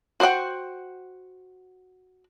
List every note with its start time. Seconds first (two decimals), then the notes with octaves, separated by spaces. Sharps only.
0.20 F#4 C5 D5 F#5 G5